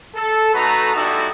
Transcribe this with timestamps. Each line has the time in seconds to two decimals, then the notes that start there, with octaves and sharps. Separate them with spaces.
0.15 A4
0.54 A3 D#4 F#4 A4 B4 A#5
0.95 G3 B3 D#4 E4 F#4 A4